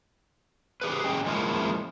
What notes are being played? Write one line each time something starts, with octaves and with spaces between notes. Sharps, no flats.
G4 G#4 B4
C#4 G#4 D#5 G5
F3 G#3 A#3 C#4 E4